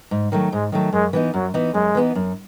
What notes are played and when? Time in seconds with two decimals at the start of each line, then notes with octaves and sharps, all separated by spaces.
0.11 G#2
0.32 D#3 F#3 A3
0.52 G#2 G#3
0.72 D#3 F#3 A3
0.93 F#2 G#3
1.13 E3 B3 D#4
1.34 F#2 F#3
1.54 E3 B3 D#4
1.74 F#2 G#3
1.95 E3 B3 D#4
2.15 F#2